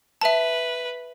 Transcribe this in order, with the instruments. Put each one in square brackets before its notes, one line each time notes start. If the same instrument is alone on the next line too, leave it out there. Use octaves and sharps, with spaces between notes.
[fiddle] B4 [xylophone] E5 A5